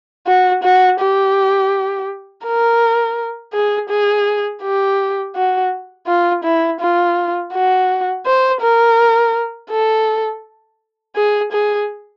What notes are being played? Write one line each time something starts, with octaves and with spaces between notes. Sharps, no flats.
F#4
F#4
G4
A#4
G#4
G#4
G4
F#4
F4
E4
F4
F#4
C5
A#4
A4
G#4
G#4